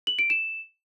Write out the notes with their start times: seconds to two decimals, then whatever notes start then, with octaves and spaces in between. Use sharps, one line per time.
0.07 F#7
0.19 D7
0.30 E7